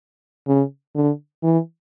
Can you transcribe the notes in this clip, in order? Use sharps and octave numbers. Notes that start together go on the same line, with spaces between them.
C#3
D3
E3